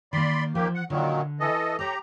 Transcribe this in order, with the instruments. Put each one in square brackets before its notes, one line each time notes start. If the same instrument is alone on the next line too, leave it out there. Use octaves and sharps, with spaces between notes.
[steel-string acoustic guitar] D#3 A#3 [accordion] D5 B5 C6
[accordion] D#2 A#3 G4 [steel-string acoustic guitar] F3
[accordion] F#5
[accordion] A#2 D#3 F#3 [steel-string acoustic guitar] D3
[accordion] E3 A4 D#5
[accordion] G4 A#5 [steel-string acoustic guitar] A4 C#5